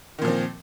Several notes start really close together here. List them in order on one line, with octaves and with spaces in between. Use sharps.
D#3 A#2 F3 C4